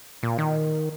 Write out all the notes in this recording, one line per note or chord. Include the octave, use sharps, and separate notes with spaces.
A#2
D#3